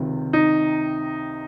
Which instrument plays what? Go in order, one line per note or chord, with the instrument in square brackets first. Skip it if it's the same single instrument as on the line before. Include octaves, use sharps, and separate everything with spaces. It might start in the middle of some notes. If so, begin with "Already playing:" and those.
Already playing: [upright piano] C#2 C3 D#3
D#4